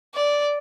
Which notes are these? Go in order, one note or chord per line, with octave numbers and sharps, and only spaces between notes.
D5